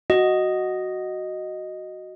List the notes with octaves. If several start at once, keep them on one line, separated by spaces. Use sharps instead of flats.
F#4 D#5